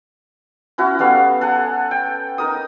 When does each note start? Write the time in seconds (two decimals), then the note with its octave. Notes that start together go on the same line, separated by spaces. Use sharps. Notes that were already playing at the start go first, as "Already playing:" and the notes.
0.78 C#4 E4 F#4
0.99 G3 B3 A4 F5
1.41 A4 F#5 G#5
1.91 G5
2.38 D#4 A#4 D#6